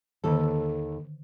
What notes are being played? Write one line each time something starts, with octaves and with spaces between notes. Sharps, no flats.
D#2 D3 D#3 A4